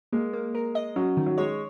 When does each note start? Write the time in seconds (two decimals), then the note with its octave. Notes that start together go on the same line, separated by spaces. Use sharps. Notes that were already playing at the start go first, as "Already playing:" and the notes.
0.13 G#3 A#3
0.33 A#3
0.55 A#4
0.75 D#5
0.96 F#3 C#4
1.17 D#3
1.26 F#3
1.38 G#3 C#5